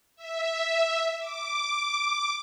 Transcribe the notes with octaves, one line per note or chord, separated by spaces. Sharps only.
E5
D6